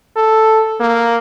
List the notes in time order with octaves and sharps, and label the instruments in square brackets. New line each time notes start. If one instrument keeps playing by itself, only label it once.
[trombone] A4
A#3